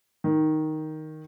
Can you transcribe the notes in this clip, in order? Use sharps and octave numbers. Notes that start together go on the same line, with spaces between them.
D#3